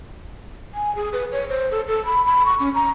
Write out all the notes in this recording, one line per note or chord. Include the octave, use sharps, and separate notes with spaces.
G#5
G#4
B4
C#5
C5
A4
A4
B5
B5
C#6
C#4
A#5